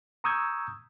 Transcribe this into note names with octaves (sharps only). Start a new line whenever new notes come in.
A#5 C#6 D#6 E6 G6 G#6